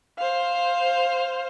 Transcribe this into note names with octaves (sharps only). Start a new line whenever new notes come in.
C5 F5